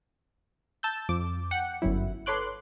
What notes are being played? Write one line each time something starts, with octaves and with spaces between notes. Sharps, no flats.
A5 E6 G6
F2 D6
F#5 G5 C#7
G1 F#2 F#3 E4
A4 B4 C#5 C6 D6 F#6